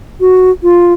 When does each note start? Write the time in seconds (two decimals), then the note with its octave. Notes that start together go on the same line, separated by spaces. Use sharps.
0.21 F#4
0.63 F4